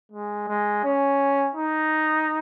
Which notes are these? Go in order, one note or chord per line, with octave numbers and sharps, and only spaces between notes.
G#3
G#3
C#4
D#4